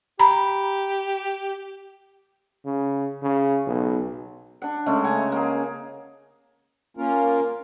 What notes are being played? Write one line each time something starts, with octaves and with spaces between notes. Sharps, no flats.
G4 A#5 B5
C#3
C#3
B1
D4 F#5
C#3 G#3 A3
F#5 G#5 A#5
A#3 G#4
A#3 C#4 F4 A#4